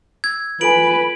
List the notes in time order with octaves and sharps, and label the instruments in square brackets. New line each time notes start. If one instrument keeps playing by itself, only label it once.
[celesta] E6 [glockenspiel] G#6
[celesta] F4 A4 G#5 [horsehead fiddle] B4 [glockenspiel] D7 F#7